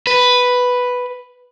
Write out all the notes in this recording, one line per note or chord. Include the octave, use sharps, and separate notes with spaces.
B4